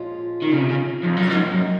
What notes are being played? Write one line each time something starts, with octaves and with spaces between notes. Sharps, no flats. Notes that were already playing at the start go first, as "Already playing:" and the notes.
Already playing: A#2 F3 G#3 C#4 F4
D#3
C#3
C3
C#3
F2
F#2
G#2 C3 F#3 A#3 D#4
F#2